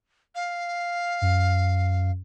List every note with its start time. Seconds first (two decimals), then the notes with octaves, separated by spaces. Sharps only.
0.35 F5
1.21 F#2